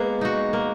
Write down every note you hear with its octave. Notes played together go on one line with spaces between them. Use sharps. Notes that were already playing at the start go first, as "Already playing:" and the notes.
Already playing: G#3 A#3 B3
D#4 F#4
A#3